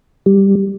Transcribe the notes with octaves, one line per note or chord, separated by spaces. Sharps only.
G3